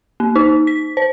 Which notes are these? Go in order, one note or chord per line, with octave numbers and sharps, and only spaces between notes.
A#3
D#4
B6
C5